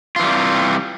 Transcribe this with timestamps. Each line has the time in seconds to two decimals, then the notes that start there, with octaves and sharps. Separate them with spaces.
0.16 F4
0.20 E3
0.23 G3
0.27 C3